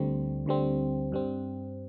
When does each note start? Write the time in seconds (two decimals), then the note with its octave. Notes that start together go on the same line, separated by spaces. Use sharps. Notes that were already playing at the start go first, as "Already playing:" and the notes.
Already playing: D2 D3 G3 C4
0.46 D2 D3 G3 C4
1.12 G2 G3 C4